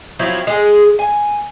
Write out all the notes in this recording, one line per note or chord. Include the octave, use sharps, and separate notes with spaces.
F3 F#3 C4 E4
G#3 G#4
G#5